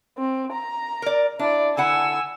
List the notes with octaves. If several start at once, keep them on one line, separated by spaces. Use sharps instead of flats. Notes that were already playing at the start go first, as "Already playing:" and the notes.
C4
A#5
A#4 D5
D4 E4 D5
D3 E4 F#5 G#5 E6